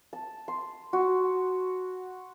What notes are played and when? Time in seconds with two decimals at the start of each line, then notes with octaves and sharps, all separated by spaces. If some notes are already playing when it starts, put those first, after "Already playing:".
0.13 A5
0.48 C6
0.93 F#4